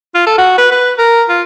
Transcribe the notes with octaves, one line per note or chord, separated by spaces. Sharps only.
F4
A4
F#4
B4
B4
A#4
F4